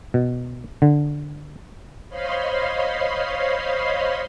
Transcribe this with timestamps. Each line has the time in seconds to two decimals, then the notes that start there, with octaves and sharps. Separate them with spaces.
0.14 B2
0.82 D3
2.09 C5 C#5 D#5 F5 B5 C6